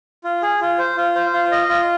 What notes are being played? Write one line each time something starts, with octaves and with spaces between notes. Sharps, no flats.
F4
G#4
F4
C5
F4
C5
F4
D#5
F4